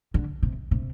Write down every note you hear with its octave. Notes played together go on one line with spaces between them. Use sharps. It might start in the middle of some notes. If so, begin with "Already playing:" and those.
D3
C3
C3